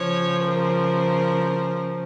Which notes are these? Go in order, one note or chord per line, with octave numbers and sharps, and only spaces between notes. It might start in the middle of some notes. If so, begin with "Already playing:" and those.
Already playing: C#3 F3 C#5
A#4